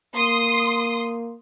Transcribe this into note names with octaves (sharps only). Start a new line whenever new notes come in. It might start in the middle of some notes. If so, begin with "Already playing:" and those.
A#3 C6 D#6